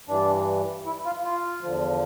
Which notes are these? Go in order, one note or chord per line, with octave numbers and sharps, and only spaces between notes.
G2 E3 D4
E4
F4
F4
E2 D3 F3